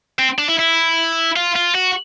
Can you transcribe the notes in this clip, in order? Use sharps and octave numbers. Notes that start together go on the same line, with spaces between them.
C4
D4
E4
E4
F4
F4
F#4